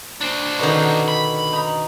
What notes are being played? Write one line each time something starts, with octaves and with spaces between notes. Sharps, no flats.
D4 C5
B2 D3 D#3
B5
D#4